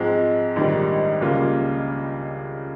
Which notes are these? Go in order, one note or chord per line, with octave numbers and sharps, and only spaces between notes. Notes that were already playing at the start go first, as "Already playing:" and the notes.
Already playing: G#2 F3 G#3 C4
A#1 G#2 D#3 G3
C#2 C#3 G3 A#3 F4